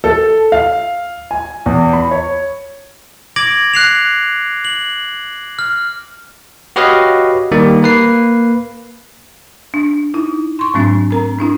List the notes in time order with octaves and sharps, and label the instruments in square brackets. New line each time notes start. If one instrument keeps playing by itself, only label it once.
[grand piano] A4
F5
G#5
E2
B5
C#5
[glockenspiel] D6 G#6 A#6 D7 F#7
F#6 C7 F7
F#7
F6
[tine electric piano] F#4 G4 B4 C#5 D#5 F5
D#3 G3 A#3
A#3 B4 C7
[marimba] D4
D#4 E4
C6 C#6
G#2 F#3 A3 C4 D4
C4 A#4 A#5
C4 D4 E4